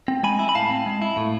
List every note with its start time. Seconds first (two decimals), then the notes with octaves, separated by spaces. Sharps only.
0.08 C4
0.23 G#3 G#5 B5
0.39 E4
0.49 B5
0.55 A2 F5 A5
0.70 C4
0.86 G#3
1.02 E4
1.17 A2